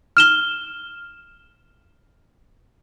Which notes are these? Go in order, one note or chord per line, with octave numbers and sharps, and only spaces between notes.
F6 E7 G7